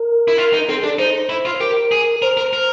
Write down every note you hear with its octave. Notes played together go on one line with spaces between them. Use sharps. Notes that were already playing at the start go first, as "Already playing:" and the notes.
Already playing: A#4
E4
F4
D#4
C4 A4
G#4
D4 A4
D#4 C5
E4
F4
G4 A#4
G#4
A#4 C5
A#4
A#4